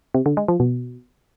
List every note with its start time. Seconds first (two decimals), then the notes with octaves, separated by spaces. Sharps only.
0.14 C3
0.26 D3
0.37 G#3
0.48 F3
0.60 B2